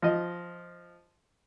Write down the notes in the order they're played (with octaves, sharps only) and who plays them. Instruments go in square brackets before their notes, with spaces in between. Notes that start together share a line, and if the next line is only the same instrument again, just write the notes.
[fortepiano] F3 D#5